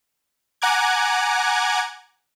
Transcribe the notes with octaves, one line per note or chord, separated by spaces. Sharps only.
F#5 G#5 A#5 D6 F#6 G#6